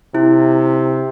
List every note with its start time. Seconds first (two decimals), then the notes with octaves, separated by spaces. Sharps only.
0.15 C3 E4